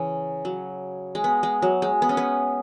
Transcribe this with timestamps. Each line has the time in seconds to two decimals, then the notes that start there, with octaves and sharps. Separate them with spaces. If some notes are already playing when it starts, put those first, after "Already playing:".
Already playing: C#3 E3
0.45 F#3
1.15 G#3
1.24 B3
1.43 G#3
1.62 F#3
1.82 G#3
2.02 B3
2.09 C#4
2.17 B3